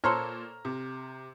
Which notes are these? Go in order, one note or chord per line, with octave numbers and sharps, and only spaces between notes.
A#2 A4 C5 C#5 A#5 F6
C3